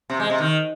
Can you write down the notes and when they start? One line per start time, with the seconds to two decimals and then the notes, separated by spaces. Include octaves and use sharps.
0.10 C3
0.20 G#3
0.30 C3
0.40 D#3